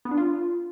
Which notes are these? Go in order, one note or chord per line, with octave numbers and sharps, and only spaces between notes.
B3
D4
F4